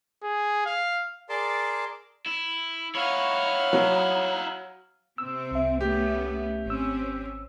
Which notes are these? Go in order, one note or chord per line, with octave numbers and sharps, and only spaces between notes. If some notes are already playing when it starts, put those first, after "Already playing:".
G#4
F5
G#4 A#4 D5 A5 C6 D6
E4
D#4 E4 C#5 F5 F#5
F#3
C3 C4 E6
C2 E5
A3 B3 C#4 G4
G#1 C4 C#4 E6